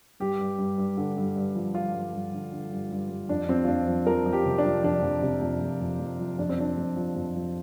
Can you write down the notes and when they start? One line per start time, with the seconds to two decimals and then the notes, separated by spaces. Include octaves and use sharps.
0.20 G2 G4
0.39 G2
0.58 G2
0.78 G2
0.98 D3
1.17 G2
1.36 G2
1.55 F3
1.75 F3 F4
1.94 G2
2.13 G2
2.33 D3
2.52 D3
2.71 G2
2.91 G2
3.10 G2
3.29 F2 D4
3.49 F3 C4
3.64 F4
3.68 F2 D4
3.87 F3
4.07 F3 A#4
4.26 F3
4.33 G4
4.46 C3
4.58 D4
4.65 F3
4.84 F2 D4
5.03 F2
5.22 C3
5.42 F2
5.61 F2
5.81 F2
6.00 F2
6.20 F3
6.39 F2 D4
6.49 C4
6.58 F3 D4
6.77 F2
6.97 F3
7.16 F2
7.35 F3